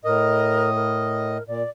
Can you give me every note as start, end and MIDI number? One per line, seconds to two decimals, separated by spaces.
0.04 1.37 45
0.04 0.70 70
0.04 1.37 75
0.76 1.43 70
1.47 1.63 46
1.47 1.69 74